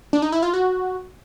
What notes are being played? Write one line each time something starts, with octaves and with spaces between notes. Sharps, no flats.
D4
D#4
E4
F4
F#4